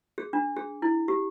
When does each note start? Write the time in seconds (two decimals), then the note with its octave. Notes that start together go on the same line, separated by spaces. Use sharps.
0.18 G#4
0.33 D4
0.56 G#4
0.82 E4
1.08 G4